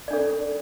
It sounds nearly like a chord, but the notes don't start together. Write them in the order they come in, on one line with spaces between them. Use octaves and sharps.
D5 D4 A4 C#4